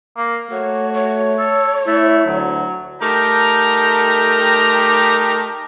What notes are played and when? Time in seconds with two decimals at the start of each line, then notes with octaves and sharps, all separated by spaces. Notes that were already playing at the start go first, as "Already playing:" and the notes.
0.17 A#3
0.51 A3 F#4 C#5
0.94 C#5
1.38 A4
1.87 A3 E4
2.27 D2 F#3
3.02 A3 D#4 G4 A#4 G5 A#5